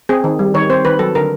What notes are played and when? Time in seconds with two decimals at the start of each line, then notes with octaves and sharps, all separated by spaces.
0.09 C4 G#4
0.24 D#3
0.39 G3
0.54 D#3 C#5
0.70 C4 C5
0.85 D#3 B4
0.99 F#3 A4
1.15 D3 A#4